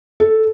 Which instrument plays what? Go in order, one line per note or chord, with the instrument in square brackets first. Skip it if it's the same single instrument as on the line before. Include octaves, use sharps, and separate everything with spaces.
[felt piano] A4